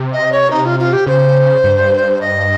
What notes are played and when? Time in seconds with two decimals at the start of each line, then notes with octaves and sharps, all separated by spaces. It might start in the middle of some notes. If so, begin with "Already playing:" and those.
Already playing: C3
0.12 D#5
0.31 C#5
0.50 D#4
0.65 F4
0.79 F4
0.92 G4
1.06 C#3 C5
1.64 G2
2.20 D#5